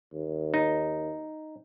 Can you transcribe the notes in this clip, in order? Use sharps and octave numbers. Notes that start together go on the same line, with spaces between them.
D#2
D#4